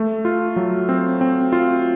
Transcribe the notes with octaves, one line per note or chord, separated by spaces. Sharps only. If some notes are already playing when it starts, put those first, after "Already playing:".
Already playing: A3
F4
F#3
C4
C4
F4